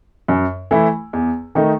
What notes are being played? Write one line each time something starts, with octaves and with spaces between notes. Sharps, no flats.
F#2
E3 A3 E4
E2
D#3 A3 D#4